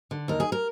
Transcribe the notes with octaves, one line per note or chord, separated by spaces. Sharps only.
D3
D#2 A#4
G#4
A#4